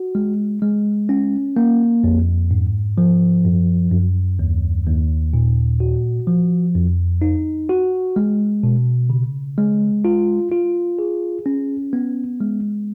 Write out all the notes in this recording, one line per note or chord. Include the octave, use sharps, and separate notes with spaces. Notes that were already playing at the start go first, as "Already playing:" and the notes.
Already playing: F#4
G#3
G#3
C#4
A#3
F2
G#2
F3
F#2
F#2
D#2
D#2
A#2
F#4
F3
F2
D#4
F#4
G#3
B2
C#3
G#3
F4
F4
G#4
C#4
B3
G#3